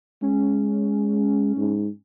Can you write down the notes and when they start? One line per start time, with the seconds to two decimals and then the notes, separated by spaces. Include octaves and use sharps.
0.22 G#3 C#4
1.57 G#2